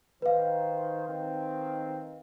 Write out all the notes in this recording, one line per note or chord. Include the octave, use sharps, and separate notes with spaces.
D#3 B4 C5 F5
D#3 C4